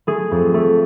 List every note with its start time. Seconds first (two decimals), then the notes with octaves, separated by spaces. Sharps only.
0.07 A3 G#4
0.31 F2
0.54 A3